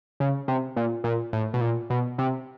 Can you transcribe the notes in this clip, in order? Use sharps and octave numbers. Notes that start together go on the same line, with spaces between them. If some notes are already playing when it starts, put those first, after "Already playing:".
C#3
C3
A#2
A#2
A2
B2
A#2
B2
C3